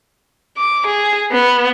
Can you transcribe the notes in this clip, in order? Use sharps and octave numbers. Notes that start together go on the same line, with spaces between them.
D6
G#4
B3